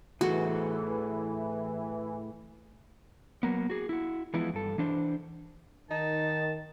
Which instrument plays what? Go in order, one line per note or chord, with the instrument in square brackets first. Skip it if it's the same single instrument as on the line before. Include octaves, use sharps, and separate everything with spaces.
[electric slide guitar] A2 G#4 A4 [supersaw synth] E3 [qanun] F#4
[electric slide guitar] F#3 A#3 B3
F#4 G#4
E4 F#4
E3 F3 G#3 B3 E4
G2 A4
E3 D4 C5
[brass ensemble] D#3 [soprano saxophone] D#4 [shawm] A5